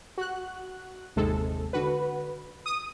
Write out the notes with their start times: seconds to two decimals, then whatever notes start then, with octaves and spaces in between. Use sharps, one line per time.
0.18 F#4 F#6
1.16 G1 D#2 C3 G#3 A4
1.73 D3 F#4 B4
2.66 D#6